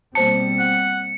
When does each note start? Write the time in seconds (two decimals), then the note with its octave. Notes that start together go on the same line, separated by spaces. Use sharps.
0.15 B2 G3 A#3 C4 C5 A5 C#7
0.59 F#5